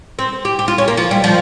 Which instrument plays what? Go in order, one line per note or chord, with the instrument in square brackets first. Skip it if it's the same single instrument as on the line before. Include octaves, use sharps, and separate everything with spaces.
[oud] C4
G4
G4
F4
C#4
A#3
F3
G3
F3